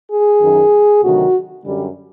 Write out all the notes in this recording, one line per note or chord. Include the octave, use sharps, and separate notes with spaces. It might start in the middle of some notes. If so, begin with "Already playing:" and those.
G#4
F#2 D#3 F#3
D2 C3 D#3 F#3 F#4
F#2 D3 G3